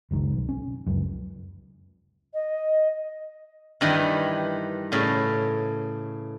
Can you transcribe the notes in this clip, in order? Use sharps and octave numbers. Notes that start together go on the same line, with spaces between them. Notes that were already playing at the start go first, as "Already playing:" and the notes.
F#1 C#2 D#3
B1
C#4
F1 C#2 F#2
D#5
G2 D#3 E3
A2 C#3